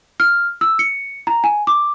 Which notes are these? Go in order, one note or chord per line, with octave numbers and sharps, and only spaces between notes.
F6
E6
C#7
A#5
G#5
D6